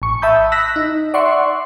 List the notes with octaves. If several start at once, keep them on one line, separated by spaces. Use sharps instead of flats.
A1 C#6
E5 A5 B5 D#6 G6
E6 F#6 A#6 B6
D#4
D5 E5 F#5 C6 C#6